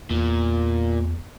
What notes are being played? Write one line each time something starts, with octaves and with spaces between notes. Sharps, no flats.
E2 A#2